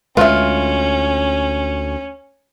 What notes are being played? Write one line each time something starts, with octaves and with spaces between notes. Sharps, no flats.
D2 G#3 C#4 F4 B4 E5